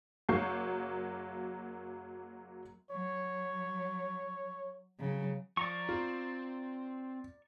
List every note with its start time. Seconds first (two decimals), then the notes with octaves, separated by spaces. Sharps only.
0.29 F#1 F#3 A#3 C#6 G6 C7
2.91 F#3 C#5
4.99 C#3 F#3
5.57 F3 D5 A#5 C#6
5.89 C4 F4